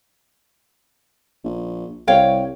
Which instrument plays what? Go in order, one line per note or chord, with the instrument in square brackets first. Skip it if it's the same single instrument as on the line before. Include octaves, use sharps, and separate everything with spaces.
[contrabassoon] A#1
[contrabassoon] C2 [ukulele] C#5 F5 G5